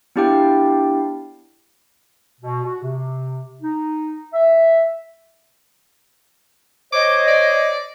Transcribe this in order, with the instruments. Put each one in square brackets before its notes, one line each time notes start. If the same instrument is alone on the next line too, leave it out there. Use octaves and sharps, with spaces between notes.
[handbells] B3 D4 E4 G4 F5 G5
[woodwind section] B2
F#4
C3
D#4
E5
[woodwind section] C5 C#5 D#5 [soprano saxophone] D6
[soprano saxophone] D5